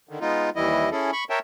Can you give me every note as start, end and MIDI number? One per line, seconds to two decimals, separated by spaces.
0.09 0.19 50
0.09 0.19 51
0.21 0.50 56
0.21 0.50 59
0.21 0.50 63
0.21 0.50 65
0.56 0.90 39
0.56 0.90 52
0.56 0.90 55
0.56 0.90 64
0.56 0.90 75
0.92 1.11 61
0.92 1.11 64
0.92 1.11 68
0.92 1.11 69
1.13 1.24 83
1.13 1.24 85
1.30 1.39 70
1.30 1.39 73
1.30 1.39 76
1.30 1.39 79
1.30 1.39 81